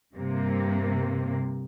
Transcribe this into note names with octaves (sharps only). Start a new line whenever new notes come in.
G2 C3 A#3